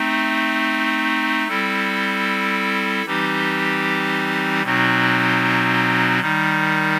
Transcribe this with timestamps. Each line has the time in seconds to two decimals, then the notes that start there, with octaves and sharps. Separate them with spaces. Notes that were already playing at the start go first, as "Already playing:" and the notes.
Already playing: A3 C4 D#4
1.48 G3 C4 E4 A4
3.05 E3 G3 C4 D#4 G4
4.62 B2 F#3 C4 D#4 F#4
6.20 D#3 G3 D#4